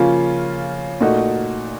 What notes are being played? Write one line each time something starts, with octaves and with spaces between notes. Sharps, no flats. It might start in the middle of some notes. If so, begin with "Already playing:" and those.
Already playing: C#3 F3 A#3 C#4 F4
A#2 A3 D#4 F#4